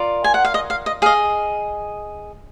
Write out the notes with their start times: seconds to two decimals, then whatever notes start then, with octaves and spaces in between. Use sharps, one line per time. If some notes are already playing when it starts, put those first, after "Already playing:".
Already playing: F4 A#4 D5
0.24 G#5
0.34 F#5
0.44 F5
0.54 D#5
0.70 F5
0.86 D#5
1.02 G#4 D#5 F5